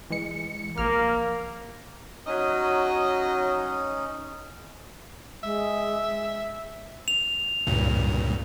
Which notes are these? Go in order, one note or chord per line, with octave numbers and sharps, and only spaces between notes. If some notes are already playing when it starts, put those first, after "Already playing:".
E3 G#3 C#7
A#1 A#3 F6
F#3 C#4 D#4 D#5
G#3 E5
F7
C#2 G2 A#2